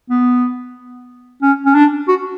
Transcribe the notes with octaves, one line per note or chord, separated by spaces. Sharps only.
B3
C#4
C#4
D4
F#4